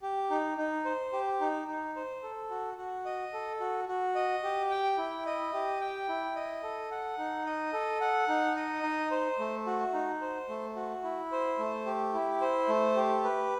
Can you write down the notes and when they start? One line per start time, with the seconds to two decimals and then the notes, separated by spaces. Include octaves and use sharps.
0.02 G4
0.31 D#4
0.58 D#4
0.85 C5
1.13 G4
1.41 D#4
1.68 D#4
1.96 C5
2.23 A4
2.50 F#4
2.77 F#4
3.05 D#5
3.33 A4
3.60 F#4
3.88 F#4
4.15 D#5
4.43 G4
4.70 G5
4.98 E4
5.26 D#5
5.54 G4
5.80 G5
6.08 E4
6.36 D#5
6.63 A4
6.91 F#5
7.18 D#4
7.46 D#5
7.73 A4
8.01 F#5
8.29 D#4
8.56 D#5
8.83 D#4
9.11 C5
9.39 A3
9.67 F#4
9.94 D#4
10.21 C5
10.49 A3
10.76 F#4
11.04 E4
11.32 C5
11.59 A3
11.86 G4
12.14 E4
12.41 C5
12.69 A3
12.96 G4
13.24 B4